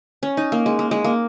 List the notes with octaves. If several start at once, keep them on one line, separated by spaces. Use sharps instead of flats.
C#4
D#4
A#3
G#3
A#3
G#3
A#3